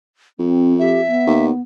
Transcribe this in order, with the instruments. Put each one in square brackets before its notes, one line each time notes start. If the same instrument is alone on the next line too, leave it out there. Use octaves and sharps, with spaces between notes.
[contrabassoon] F2 [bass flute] C4
[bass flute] G4 [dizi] E5
[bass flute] B3
[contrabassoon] D#2